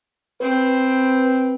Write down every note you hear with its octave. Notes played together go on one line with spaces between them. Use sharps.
C4 B4